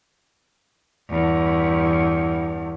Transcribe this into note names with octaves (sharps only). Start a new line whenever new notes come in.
E2 G2